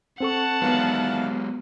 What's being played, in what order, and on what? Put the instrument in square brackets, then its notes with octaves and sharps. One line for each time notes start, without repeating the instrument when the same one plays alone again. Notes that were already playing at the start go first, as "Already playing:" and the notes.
[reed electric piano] C4 A4 C#6 [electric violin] F#5 A5
[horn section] D#3 E3 F5 [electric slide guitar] F#3 G#3 [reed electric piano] B3